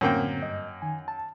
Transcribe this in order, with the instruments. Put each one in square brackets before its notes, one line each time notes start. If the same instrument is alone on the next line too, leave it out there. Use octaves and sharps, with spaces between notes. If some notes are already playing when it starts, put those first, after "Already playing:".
[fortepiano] F#2 A#3 G5 [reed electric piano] A2 D3 C4
[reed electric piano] G2 D#5
D#3 G#5
A5